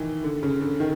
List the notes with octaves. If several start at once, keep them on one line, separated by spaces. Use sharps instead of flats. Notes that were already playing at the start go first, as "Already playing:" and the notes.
Already playing: D#3 E3
D3
C#3
D3
D#3